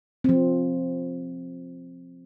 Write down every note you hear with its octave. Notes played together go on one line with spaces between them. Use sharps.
F3 C4